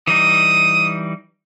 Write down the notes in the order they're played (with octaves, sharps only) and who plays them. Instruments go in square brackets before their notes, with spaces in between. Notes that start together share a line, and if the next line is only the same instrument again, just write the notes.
[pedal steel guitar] E3 G3 D#4 [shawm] D#6